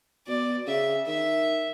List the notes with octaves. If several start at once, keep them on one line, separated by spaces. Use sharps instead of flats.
B2 D5
C#3 E5
D#3 E5